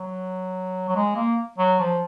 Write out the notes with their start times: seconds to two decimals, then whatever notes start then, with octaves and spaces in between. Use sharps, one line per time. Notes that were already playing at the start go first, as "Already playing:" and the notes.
Already playing: F#3
0.89 F#3
0.96 G#3
1.16 A#3
1.58 F#3
1.80 F3